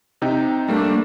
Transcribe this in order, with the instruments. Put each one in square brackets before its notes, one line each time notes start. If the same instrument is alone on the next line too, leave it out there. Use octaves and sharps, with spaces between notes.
[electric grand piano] C3 D#4 G5
[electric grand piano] G3 A#3 [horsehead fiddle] A3 D4